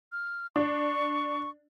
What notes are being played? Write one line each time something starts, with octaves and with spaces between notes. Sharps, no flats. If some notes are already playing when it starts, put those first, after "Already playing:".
F6
D4 C#6